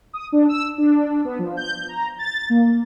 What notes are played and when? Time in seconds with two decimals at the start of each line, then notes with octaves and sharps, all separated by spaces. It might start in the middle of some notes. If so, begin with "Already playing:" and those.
0.13 D#6
0.32 D4
0.49 E6
0.78 D4
1.25 B3
1.39 F3
1.57 G6
1.89 A#5
2.19 A6
2.50 A#3